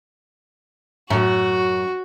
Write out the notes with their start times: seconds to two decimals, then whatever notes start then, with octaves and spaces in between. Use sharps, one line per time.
1.10 F#2 A2 F#4